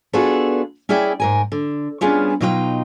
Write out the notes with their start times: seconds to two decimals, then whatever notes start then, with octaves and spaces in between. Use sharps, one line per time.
0.13 B3 D4 F4 F#4 G#4 A4
0.89 C#4 E4 G#4 D5 E5 G5
1.20 G#2 A#4 G#5
1.52 D3
2.01 G3 B3 C#4 D4 F4 G#4
2.41 B2 F#3 D#4 F4 C#5 G5